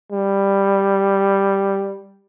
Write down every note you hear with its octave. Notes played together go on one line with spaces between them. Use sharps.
G3